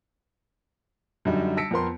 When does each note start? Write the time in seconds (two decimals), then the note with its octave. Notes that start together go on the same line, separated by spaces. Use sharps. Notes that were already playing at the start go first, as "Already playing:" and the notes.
1.25 F#2 D3 G3 D#4
1.57 A5 E6 A#6 B6 C#7 D7
1.71 F2 B3 A#4 C6